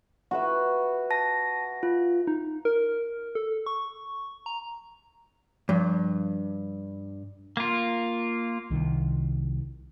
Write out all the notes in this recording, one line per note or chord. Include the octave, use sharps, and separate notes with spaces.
F#4 B4 E5
A5 A#6
F4
D#4
A#4
A4
C#6
A#5
G2 F3
A#3 F4
C2 D#3 F3